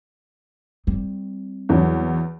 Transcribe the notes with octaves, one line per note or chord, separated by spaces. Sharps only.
G3 C4
E2 F#3